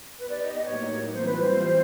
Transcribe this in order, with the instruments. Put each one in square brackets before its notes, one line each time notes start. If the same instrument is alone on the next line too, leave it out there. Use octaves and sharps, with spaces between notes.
[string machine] B3 D#4 G4 [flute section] B4
[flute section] D5
D#5
D#5
[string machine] A2 F#3 A#3 D#4 [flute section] C#5
[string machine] E3 G3 C4 F4 [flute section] C5
[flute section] B4
C5